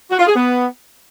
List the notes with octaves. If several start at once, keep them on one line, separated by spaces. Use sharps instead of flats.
F#4
F4
G#4
B3